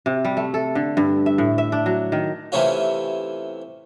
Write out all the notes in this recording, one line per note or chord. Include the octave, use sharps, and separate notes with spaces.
C3
G3
A3
A4
D3
G2
E5
A2
E5
D4
F#3
D#3
C3 E3 A3 C#4 F4